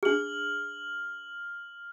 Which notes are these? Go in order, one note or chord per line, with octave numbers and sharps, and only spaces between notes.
D4 G#4 F6 F#7